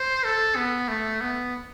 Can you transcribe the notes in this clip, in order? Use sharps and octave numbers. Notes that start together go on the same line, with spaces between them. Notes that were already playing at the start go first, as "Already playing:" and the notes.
Already playing: C5
A4
B3
A3
B3